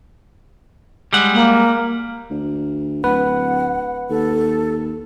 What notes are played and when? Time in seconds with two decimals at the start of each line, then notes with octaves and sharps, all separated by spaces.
1.13 G3 G#3 F#5
1.33 A#3
2.31 D2
3.04 D1 B4 F#5
4.10 D#2 A4